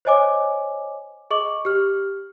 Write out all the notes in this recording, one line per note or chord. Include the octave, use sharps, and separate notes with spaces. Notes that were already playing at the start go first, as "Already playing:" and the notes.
C5 C#5 D#5 G#5 D6
G#4 D#5 C#6 D6 F#7
G4 F6